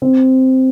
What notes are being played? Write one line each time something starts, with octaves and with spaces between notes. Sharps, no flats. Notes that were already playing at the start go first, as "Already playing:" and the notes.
C4